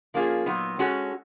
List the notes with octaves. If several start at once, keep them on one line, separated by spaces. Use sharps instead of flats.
F3 A#3 C#4 F4 G#4
A#2 F#3 B3 D#4
G#3 C#4 F#4 A4